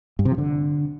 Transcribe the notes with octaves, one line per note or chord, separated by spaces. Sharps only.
G2
C3
F3
D3